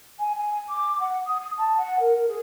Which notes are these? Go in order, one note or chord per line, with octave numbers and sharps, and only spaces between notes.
G#5
G#5
D6
F#5
D#6
D#6
A5
F#5
A#4
G#4